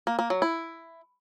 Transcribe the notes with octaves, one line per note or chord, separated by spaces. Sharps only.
A#3
A#3
F#3
E4